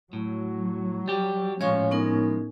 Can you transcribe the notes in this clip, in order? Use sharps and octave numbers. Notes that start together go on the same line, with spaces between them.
A2 F#3
G3 G4
A2 F3 G#3 C#4 C#5 F5 C#6
B3 D#4 A#4